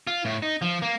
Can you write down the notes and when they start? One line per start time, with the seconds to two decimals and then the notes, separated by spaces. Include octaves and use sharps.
0.07 F4
0.25 A2
0.42 D#4
0.62 F3
0.82 A#3